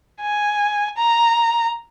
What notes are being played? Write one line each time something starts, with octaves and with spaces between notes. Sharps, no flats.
G#5
A#5